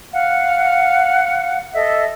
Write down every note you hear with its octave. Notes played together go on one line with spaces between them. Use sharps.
F5 F#5
A4 D#5 E5